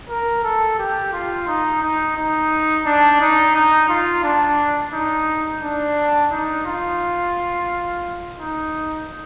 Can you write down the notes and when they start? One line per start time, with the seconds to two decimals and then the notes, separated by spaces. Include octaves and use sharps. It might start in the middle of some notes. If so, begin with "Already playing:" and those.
0.09 A#4
0.44 A4
0.79 G4
1.13 F4
1.47 D#4
1.82 D#4
2.17 D#4
2.85 D4
3.21 D#4
3.55 D#4
3.89 F4
4.24 D4
4.93 D#4
5.62 D4
6.32 D#4
6.66 F4
8.39 D#4